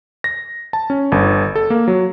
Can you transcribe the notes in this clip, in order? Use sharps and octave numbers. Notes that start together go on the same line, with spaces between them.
A#6
A5
C#4
G1
A4
A#3
F#3